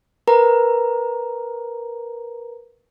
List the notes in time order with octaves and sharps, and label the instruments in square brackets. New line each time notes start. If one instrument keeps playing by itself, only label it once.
[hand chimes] A#4 B4 A#5